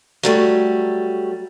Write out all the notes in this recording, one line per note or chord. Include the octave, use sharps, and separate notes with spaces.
F#3 G3 A3